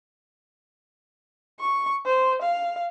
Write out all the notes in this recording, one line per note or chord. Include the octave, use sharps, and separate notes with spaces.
C#6
C5
F5